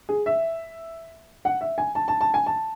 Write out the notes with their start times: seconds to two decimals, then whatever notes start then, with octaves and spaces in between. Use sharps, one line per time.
0.09 G#4
0.26 E5
1.45 F#5
1.61 E5
1.78 G#5
1.95 A5
2.08 A5
2.21 A5
2.34 G#5
2.46 A5